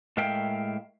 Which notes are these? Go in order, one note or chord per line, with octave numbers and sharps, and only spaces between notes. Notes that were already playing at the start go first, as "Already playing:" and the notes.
A2 G#3 A#4 E5 F5 G5